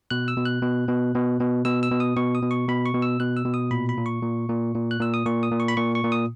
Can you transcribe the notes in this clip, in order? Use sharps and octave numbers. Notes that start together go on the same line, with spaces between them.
B2 F#6
E6
B2
F#6
B2
B2
B2
B2
B2 E6
E6
B2
D#6
B2 C#6
D#6
B2
C#6
B2 B5
C#6
B2
E6
B2 F#6
E6
B2
D#6
A#2 B5
B5
A#2
C#6
A#2
A#2
A#2
F#6
A#2 E6
D#6
A#2 C#6
D#6
A#2
C#6
B5
A#2 C#6
C#6
A#2
D#6